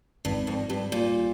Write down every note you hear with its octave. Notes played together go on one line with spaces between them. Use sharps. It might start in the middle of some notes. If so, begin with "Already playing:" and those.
G#1 G2
F2
G2 G3
A#2